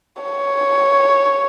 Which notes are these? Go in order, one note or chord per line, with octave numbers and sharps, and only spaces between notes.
C#5